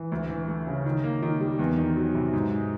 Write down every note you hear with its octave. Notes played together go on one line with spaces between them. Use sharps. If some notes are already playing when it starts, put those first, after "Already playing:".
Already playing: E3
D2
E3
A3
C#3
D#3
A#3
D#3
G3
E2
D#3
F#3
C3
G#2
G#3